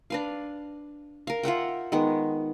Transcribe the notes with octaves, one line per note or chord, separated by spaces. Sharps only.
D4 B4 F5
A#4 F5
F4 E5 F#5 G5
D#3 G#3 B3